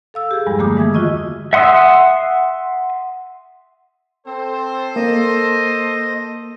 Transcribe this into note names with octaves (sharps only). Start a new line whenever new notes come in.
A4 F5 E6
G4 G#4
E2 G2 F3 G3 G#3
D3 A3 A#3 G4 D6 D#6
D#3 E3 G#3 E5 D#6 G#6
F4 F#4 D#5 C#6 E6
E5 F#5 C6 D#6 E6
C4 A4 C5
A#3 D#5